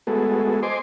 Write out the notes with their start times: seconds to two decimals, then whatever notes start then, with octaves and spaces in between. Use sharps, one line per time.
0.07 G#3 A3 B3 F#4 G#4 A4
0.63 C5 D#5 G#5 C6 D6